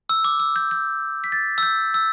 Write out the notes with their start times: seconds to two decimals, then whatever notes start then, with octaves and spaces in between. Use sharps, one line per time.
0.09 E6
0.24 D6
0.40 E6
0.56 G6
0.71 G6
1.24 B6
1.32 A6
1.58 E6
1.63 G6
1.94 E6